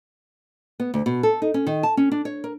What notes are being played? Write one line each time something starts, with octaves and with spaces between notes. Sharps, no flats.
B3
D2
B2
A4
D#4
C#4
D#3
A5
C#4
D4
C#5
A#4